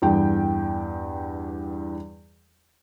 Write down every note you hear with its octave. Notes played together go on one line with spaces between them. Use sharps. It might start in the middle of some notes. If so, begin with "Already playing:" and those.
E2 G2 G5